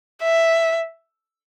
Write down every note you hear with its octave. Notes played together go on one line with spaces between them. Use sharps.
E5